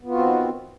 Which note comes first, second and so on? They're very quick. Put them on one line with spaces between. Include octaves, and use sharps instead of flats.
B3 F4 F#4 C4 D#3